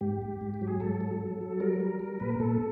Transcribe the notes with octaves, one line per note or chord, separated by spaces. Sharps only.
G#2 G4
G#2
G#2
G4
F#3
G#4
G#2 A4
F#3
F#3
F#3
G3 A#4
G3
G3
A#2 B4
A#4
A#2 A4